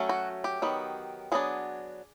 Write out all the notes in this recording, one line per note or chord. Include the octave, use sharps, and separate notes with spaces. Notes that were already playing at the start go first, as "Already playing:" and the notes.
Already playing: F#3 A3 C#4
F#4
G4
D#3 F#3 B3
F#3 B3 D4 G#4